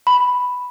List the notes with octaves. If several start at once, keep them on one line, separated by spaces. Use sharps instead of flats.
B5